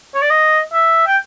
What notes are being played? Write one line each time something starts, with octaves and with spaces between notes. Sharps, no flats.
C#5
D5
D#5
E5
G5